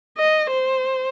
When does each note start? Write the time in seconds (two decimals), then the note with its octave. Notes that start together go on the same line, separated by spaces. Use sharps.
0.18 D#5
0.50 C5